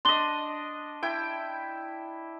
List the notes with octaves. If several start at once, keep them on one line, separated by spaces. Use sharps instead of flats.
D4 D#5 C6 G7
E4 G5